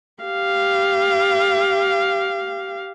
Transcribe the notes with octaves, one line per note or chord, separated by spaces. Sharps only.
G4 F5